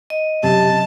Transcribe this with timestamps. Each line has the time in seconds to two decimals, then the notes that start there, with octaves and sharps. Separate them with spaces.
0.10 D#5
0.43 F#2 C3 A5